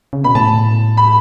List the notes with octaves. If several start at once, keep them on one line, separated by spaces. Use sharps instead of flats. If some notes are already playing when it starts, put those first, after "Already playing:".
C#3
B2 B5
A2 A5
B5